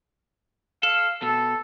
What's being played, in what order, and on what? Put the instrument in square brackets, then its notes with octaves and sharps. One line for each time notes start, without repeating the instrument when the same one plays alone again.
[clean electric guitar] A4 [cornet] F5
[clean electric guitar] B2 [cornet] A4